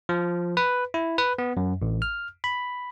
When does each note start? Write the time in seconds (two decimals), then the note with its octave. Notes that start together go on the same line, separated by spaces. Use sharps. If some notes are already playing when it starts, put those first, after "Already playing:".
0.09 F3
0.57 B4
0.94 E4
1.18 B4
1.38 B3
1.57 F#2
1.82 A1
2.02 F6
2.44 B5